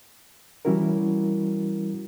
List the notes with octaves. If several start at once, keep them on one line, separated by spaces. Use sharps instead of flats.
E3 G3 C#4 E4 F#4 A#4